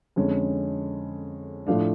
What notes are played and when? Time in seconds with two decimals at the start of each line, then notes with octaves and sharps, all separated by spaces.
0.16 F2 D3 G#3 C#4
1.67 A2 F3 A3 D4 F5